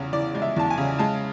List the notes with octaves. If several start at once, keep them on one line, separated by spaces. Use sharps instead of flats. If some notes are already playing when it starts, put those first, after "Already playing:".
Already playing: E2 C#3
E3 D5
G#3
E5
E2 A5
G#5
C#3
G#3 A5